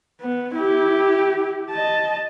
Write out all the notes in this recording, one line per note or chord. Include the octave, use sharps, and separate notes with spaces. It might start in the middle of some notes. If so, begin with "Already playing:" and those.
B3
E4 G4
D#5 A5